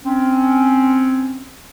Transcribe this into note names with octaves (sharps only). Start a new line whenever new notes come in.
C4 C#4